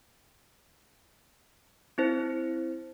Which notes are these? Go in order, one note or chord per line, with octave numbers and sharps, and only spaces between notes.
C4 E4 C5